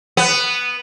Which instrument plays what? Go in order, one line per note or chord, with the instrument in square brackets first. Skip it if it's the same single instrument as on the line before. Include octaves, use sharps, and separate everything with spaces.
[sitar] B3